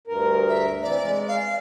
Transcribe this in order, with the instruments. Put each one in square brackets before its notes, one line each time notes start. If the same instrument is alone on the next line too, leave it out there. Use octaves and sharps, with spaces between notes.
[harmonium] D2 G2 A#4
[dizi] E5
[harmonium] C3 E3 [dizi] D5
[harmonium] G#3
[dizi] F5